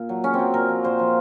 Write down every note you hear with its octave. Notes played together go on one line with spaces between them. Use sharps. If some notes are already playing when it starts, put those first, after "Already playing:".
Already playing: A#2
F#3
C#3 C#4
C4
F#3
A#2 A#4
F3
A#2 C5
F3